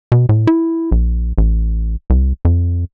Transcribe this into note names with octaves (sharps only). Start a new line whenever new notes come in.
B2
A2
E4
A#1
A1
C2
F2